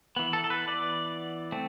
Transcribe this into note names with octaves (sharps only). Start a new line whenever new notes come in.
E3 B3
A4
A4
B4
D5
A3 C4